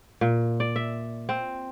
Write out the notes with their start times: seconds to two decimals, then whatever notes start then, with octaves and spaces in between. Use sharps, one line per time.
0.21 A#2
0.60 D5
0.76 E5
1.29 C4